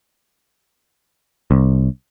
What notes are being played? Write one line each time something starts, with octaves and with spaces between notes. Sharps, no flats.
C2